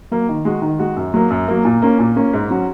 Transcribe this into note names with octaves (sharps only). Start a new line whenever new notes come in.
F#3 A#3
D#3
G#3 F#4
D#3
G#3 F#4
F#2
F#3 A#3
F#2
F#3 A#3
A#2
A#3 C#4
A#2
A#3 C#4
G#2
F#3 C#4 F#4